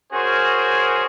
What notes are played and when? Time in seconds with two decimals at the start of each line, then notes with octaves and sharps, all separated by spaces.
0.12 C#4 F#4 G#4 A#4 C5